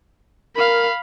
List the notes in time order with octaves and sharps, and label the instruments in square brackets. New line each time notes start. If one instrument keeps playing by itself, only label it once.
[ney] A#4 [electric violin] F5 B5